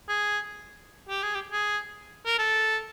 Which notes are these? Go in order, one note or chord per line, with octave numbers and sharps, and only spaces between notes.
G#4
G4
G#4
G4
G#4
A#4
A4